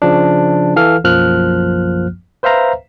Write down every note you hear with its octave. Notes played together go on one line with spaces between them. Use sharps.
C#3 F3 D4
E3 A4 F5 F6
B1 F#2 F3 A#3 F6 F#6
B4 C5 E5 F5 A#5